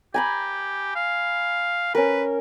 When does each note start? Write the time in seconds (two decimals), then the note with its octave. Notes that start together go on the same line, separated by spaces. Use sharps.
0.14 G4 G#5 A#5 B5
0.95 F5
1.95 C#4 A#4 B4